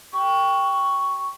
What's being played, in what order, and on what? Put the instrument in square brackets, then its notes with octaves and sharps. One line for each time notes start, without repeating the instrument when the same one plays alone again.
[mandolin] G4 [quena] C#6